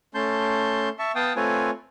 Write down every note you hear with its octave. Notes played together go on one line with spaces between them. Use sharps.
A3 C#4 A5 C6 G6
E5 A5 C#6
B3 F5 G5 A5 D#6
A3 C4 F4 B4 C#5 G#5